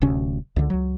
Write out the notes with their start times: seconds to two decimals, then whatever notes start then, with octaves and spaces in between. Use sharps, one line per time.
0.01 D1 D2 C3 C#4
0.56 C#2 D3
0.70 C#2 F#3